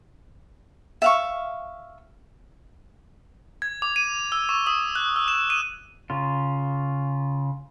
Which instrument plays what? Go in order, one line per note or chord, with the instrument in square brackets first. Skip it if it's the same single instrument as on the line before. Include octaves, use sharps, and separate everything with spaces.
[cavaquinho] E5 F5 C#6
[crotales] G#6
D6
D#7
E6
C#6
D#6
F#6
E6
E7
D#7
[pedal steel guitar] C#3 F4